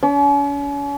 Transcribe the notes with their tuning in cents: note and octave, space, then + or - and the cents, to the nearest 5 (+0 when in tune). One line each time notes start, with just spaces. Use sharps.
C#4 +40